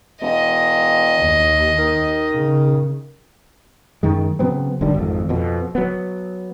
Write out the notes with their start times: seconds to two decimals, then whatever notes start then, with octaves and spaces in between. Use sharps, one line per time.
0.22 E1 D#5
1.19 D#2
1.79 D#3
2.34 C#3
4.03 F#2 D#3 G#3
4.39 C#3 F#3 B3 C4
4.81 G#1 D3 D#3 G3
4.94 G#1 F2
5.29 F2 B2
5.75 F#3 B3